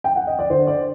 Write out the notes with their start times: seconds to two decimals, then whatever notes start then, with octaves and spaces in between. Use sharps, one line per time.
0.04 G5
0.16 F#5
0.27 D#5
0.39 D5
0.50 D3 C5
0.67 D5